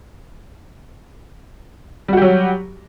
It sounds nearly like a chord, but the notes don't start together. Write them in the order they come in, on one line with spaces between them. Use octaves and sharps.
G3 F#4 G4 F#3